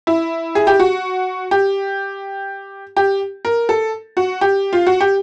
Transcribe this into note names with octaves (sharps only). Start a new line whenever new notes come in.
E4
G#4
G4
F#4
G4
G4
A#4
A4
F#4
G4
F4
F#4
G4